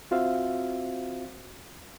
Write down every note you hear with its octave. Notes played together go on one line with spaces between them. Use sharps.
C4 F4 F#4 C5 E5 F5